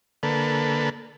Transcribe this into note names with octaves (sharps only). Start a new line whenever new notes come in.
D3 A#3 A4 B4